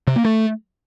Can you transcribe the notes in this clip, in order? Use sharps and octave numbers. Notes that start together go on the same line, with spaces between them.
C3
A#3
A3